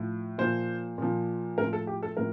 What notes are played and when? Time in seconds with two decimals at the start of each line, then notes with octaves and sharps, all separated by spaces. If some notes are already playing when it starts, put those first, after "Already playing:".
Already playing: A2 F3
0.38 A#2 F3 C5
0.98 A#2 F3
1.58 A2 F3 A#4
1.73 A4
1.87 G4
2.03 A4
2.17 A2 F3 A#4